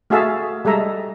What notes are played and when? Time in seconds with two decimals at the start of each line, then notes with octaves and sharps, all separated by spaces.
0.10 A3 F#4 G#4 E5 F5 A5
0.65 G3 G#3 A4 E5 A#5